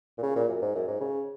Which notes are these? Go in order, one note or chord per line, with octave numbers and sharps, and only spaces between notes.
A#2
C#3
A#2
F#2
G#2
F#2
G#2
C#3